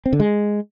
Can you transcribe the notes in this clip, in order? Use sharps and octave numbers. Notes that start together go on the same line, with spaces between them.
C4
D3
G#3